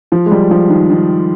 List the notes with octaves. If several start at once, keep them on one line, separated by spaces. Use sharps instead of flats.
F3
G#3
G3
F3
D#3
D#3